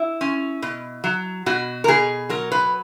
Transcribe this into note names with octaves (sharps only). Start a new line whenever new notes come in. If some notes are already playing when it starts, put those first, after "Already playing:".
Already playing: E4
C#4
B2
F#3
B2 F#4
A#4
B2 G#4
F#3 A#4
B4